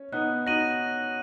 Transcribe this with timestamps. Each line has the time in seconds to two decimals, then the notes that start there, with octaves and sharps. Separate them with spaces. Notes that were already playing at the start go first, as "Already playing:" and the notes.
Already playing: C#4
0.12 B3 D#4 F#6
0.46 D#4 F#4 A#6 D#7 F#7